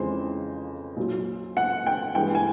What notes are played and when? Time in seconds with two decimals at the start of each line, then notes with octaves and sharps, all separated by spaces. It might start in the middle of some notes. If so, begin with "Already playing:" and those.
Already playing: F2 C#3 E3 G#3 C5
0.97 A#2 F#3
1.57 F#5
1.86 G5
2.15 G2 E3 G#3 G5
2.35 G#5